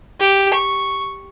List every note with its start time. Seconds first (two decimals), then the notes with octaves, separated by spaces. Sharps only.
0.20 G4
0.53 C#6